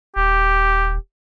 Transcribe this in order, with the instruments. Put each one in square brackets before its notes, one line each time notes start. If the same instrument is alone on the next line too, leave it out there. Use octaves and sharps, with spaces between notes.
[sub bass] D#1 [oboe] G4